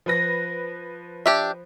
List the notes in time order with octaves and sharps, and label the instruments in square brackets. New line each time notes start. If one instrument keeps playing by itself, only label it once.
[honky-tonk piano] F3 B4 A#6
[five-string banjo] D4 G4 E5